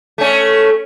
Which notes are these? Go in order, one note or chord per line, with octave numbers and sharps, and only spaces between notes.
A3 C#4